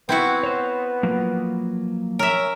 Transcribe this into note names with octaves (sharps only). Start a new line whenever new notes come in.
B3 C4 E4 F#4
C5 C#5
F3 F#3 A#3
C#4 A#4 E5